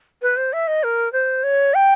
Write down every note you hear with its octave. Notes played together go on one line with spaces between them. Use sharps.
B4
C5
E5
D#5
A#4
C5
C#5
G5